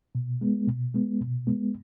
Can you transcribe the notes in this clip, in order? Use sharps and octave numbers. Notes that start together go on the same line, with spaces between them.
B2
G#3 B3
B2
G#3 B3
B2
G#3 B3